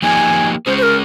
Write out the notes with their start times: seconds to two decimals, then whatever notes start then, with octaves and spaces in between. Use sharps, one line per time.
0.02 F3 A#3 D#4 G4 G#5
0.66 G#3 C#4 G#4 C5
0.78 C5
0.83 A#4